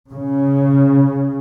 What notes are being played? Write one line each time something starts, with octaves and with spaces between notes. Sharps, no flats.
C#3